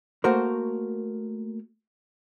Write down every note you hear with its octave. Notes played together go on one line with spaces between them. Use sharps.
A3 A#3 F#4 A#4 C5